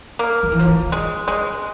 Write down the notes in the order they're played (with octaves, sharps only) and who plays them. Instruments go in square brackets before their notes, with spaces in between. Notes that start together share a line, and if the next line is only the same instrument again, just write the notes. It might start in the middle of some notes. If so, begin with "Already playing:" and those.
[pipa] A#3
[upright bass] F3
E3
F3
E3
[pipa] G#3
G#3